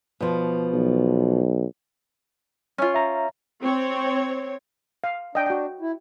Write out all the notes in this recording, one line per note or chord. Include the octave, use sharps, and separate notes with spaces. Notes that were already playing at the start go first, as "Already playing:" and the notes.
B2 F3
B1
C#4 F4
E5 A#5
C4 C#5
F5
D4 D#5 G5
F#4 G5
E4